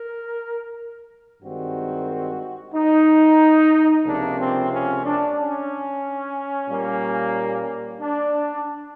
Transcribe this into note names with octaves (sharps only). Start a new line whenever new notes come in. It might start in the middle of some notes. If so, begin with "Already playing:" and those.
Already playing: A#4
G2 D#3 G#3 C4 F#4
D#4
C#2 C3 F3 A#3 D4
C4
C#4
D4
C#4
A#2 G3 A#3
D4